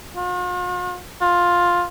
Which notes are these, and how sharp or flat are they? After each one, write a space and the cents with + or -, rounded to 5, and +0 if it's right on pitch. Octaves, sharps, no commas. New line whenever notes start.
F4 +45
F4 +10